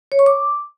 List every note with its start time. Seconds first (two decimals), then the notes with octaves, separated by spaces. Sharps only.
0.12 C#5
0.19 C#6
0.26 D6